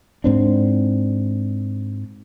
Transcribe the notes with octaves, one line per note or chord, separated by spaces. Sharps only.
G#2 C4 D4